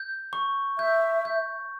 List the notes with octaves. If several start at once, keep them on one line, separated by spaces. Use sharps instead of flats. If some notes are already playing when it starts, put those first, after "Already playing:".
Already playing: G6
C#6
E5 G6
G6